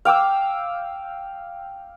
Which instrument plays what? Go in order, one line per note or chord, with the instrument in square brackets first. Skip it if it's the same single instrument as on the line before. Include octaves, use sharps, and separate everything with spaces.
[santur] F5 G5 D6 E6